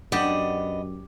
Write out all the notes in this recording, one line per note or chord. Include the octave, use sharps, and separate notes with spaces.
F#2 B3 D4 G4 D#5 F#5